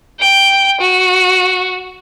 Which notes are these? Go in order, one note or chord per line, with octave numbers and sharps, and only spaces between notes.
G5
F#4